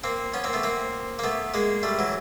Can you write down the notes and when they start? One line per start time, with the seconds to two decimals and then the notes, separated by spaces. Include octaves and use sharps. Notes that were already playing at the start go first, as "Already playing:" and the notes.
0.04 A#3 C4
0.34 B3 C#4
0.44 A#3 C4
0.53 A3 B3
0.63 A#3 C4
1.19 A#3
1.24 A3 B3
1.54 G#3 A#3
1.83 G3 A3
1.99 E3 F#3